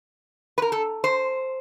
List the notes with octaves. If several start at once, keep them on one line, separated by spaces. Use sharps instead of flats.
B4
A#4
A4
C5